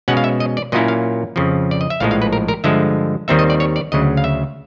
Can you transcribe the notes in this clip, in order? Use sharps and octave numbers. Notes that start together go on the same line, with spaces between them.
B2 G#3 C#4 F#5
F5
E5
D#5
D5
A#2 F#3 A#3 C#4 E4 D#5
F5
F2 C#3 F3
D5
D#5
E5
A#1 A2 F3 G#3 F5
F5
B4
A#4
A#4
G2 D3 F3 G#3 E5
D#2 D#3 G3 C4 D#4 E5
D#5
D5
C#5
D5
D2 C#3 F#3 D#5
F5
E5